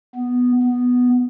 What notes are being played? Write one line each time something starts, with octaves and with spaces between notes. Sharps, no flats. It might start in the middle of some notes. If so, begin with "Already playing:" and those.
B3
B3